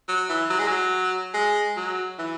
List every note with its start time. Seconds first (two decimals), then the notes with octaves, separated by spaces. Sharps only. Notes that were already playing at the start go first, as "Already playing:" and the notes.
0.09 F#3
0.29 E3
0.50 F#3
0.59 G#3
0.67 F#3
1.34 G#3
1.77 F#3
2.19 E3